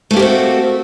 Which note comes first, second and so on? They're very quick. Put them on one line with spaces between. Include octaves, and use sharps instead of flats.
A3 A#3 G4 C4 F#4